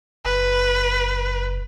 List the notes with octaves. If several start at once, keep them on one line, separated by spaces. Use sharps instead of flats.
F#1 B4